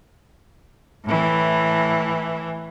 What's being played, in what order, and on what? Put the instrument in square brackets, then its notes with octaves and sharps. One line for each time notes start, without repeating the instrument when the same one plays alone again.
[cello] A2 E3